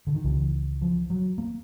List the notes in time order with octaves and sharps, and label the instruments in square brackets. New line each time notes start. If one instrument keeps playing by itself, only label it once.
[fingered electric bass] D3
D#3
C#2 C#3 E3
F3
F#3
A#3